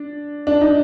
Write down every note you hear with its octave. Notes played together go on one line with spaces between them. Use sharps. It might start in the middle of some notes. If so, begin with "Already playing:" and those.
Already playing: D4
D4
D#4